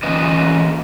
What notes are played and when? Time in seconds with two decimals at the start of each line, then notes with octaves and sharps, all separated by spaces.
0.03 A#2 E3 C#4 B4 D#5